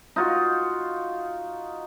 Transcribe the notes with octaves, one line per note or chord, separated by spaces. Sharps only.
D#4 F4 F#4